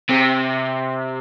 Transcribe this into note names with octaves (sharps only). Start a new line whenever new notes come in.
C3